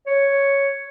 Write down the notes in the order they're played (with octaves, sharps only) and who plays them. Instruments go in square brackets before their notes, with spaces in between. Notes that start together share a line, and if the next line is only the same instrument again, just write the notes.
[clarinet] C#5